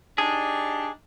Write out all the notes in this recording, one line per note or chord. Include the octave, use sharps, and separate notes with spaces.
D4 D#4 G4 G#4